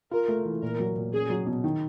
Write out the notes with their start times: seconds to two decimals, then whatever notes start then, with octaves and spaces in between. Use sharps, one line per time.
0.11 F4 A#4
0.28 A3
0.45 E3
0.62 A#2 A#4
0.79 F#3
0.96 A#2
1.13 C#4 G#4
1.30 F#3
1.47 B2
1.64 D#3